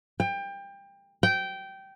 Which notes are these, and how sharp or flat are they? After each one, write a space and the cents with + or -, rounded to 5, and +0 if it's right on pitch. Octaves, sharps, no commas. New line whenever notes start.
G5 +25
G5 -15